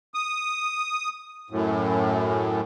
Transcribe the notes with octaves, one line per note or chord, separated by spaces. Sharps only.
D#6
F#2 A2